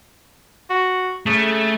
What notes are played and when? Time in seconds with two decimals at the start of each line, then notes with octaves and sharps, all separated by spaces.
0.70 F#4
1.26 C#3 A3